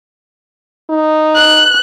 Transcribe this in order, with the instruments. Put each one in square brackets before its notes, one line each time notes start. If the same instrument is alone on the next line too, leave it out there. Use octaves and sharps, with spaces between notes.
[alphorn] D#4
[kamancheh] F#6